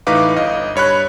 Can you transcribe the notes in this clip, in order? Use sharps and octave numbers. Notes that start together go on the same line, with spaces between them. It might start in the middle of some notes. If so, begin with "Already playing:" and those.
A2 E3 D#4 B4 F5 D6
G1 D#5 F5
G2 C#5 B5 F#6